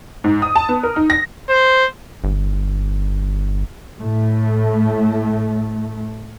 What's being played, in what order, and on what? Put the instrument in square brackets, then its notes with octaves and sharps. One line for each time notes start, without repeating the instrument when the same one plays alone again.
[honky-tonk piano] G#2
D#6
A5
B3
A#4
D#4
A#6
[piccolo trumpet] C5
[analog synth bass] G1
[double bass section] A2 A3